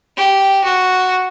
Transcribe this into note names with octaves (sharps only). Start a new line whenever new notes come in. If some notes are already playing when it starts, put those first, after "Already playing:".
G4
F#4